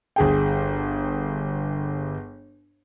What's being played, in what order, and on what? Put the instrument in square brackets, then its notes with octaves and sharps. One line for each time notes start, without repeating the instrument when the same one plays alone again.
[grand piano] G1 G#4 G5